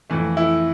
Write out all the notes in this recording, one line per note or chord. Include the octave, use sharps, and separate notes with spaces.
F2 E3 A3
E4